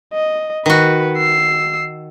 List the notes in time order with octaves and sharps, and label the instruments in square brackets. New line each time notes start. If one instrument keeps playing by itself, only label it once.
[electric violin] D#5
[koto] D#3 F#4 [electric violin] B4
[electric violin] E6 C7